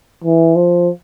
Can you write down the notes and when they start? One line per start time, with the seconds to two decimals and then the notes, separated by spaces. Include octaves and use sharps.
0.24 E3
0.56 F3